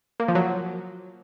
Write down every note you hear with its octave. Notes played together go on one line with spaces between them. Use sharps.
A#3
F3
F#3